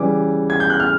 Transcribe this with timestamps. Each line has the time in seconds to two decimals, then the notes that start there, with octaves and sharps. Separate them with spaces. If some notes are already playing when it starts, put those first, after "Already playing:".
Already playing: C#3 E3 G3 D6
0.50 G#6
0.60 G6
0.70 F#6
0.80 F6